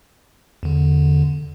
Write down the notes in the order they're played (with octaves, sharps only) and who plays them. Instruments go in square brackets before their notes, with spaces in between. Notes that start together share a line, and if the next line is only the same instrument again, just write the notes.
[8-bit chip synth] E2 D3